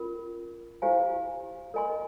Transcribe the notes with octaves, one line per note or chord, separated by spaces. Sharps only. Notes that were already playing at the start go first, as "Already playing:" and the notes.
Already playing: C#4 F4 A#4
E4 G4 C5 F5 G#5
A#4 D#5 G#5 C6